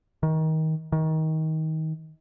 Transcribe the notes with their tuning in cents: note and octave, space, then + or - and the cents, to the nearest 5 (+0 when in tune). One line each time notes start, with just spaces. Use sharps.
D#3 +25
D#3 +25